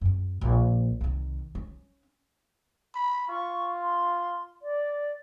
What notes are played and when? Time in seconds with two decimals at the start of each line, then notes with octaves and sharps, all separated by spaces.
0.01 F#2 C4
0.41 A#1
1.01 C2 D#3
1.55 C#4
2.95 B5
3.29 F4 C#6
3.81 C6
4.62 D5